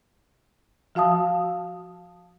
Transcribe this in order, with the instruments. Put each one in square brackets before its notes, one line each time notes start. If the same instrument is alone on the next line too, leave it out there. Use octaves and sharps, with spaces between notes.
[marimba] F3 F#4 F5 A5 D#6